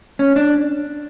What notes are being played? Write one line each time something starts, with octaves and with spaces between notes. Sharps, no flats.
C#4
D4